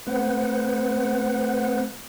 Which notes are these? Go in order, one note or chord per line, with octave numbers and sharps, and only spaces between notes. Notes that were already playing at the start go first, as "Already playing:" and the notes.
A3 C4 B4 C5 F#5